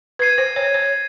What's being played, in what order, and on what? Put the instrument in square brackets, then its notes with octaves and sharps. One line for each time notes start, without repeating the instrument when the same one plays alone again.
[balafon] B4 [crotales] G#6 C7 D#7
[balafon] C5
C#5
C#5